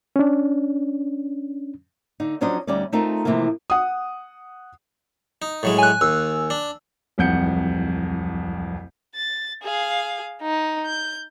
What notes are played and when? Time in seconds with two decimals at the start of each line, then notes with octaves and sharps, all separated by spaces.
0.16 C#4 D4
2.20 D3 D#4
2.41 F3 F#3 C#4 D4 C5 D#5
2.67 D2 G3 C#4 D#4 D5
2.92 A3 C4 D#4 F4 A4 A#4
3.25 C3 E3 F3 A3 A#3
3.70 F#5 D#6
5.42 D#4
5.63 A2 F#3 G#3
5.78 G#5 F#6
6.01 D#2 E6
6.50 D4
7.18 D1 C2 F2 F#5 G6 C#7
9.16 A6
9.64 G#4 F5
10.42 D#4
10.86 G6